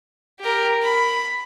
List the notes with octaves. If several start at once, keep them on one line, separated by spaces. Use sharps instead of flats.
G4 A#4
B5